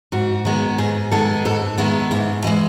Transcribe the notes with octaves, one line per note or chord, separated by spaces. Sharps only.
G#2 F#4
D#3 G#3 B3
G#2 G#4
D#3 G#3 B3 A4
G#2 A4
D#3 G#3 B3 E4
G#2 E4
E3 G#3 D#5